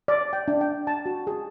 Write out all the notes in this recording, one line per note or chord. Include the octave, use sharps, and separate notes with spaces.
D5
G5
D4
G5
A5
F#4
G#4